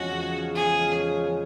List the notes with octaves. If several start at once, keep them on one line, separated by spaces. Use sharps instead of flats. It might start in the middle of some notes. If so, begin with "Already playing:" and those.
Already playing: E2 C#3 F3 G#3 C#4 F#4
G#4